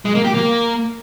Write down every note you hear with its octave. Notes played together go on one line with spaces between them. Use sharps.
G#3
A#3
G4
A#3